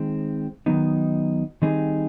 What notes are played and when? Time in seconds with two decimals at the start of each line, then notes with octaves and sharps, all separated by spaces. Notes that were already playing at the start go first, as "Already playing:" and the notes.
Already playing: D#3 G#3 C4
0.66 D#3 F#3 B3 D#4
1.62 D#3 G3 C4 D#4 G#4